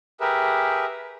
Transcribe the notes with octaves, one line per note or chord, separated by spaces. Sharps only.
G4 G#4 A#4 B4 E5